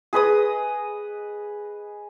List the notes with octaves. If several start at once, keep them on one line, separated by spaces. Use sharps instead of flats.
G#4 B4 D#5 D#6